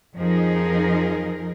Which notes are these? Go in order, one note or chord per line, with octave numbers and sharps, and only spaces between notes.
F2 F3 D#4 G#4 A#4